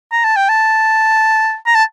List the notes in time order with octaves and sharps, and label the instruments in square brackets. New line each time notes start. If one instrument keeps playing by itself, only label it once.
[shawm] A#5
A5
G5
A5
A#5
A5